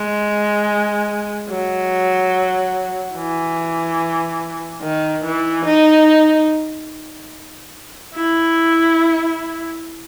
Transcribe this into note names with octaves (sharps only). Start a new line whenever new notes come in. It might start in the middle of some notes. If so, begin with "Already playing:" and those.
Already playing: G#3
F#3
E3
D#3
E3
D#4
E4